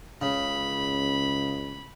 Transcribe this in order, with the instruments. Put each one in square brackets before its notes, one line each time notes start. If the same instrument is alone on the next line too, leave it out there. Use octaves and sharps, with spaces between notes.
[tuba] C#2 [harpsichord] C#3 [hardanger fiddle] B5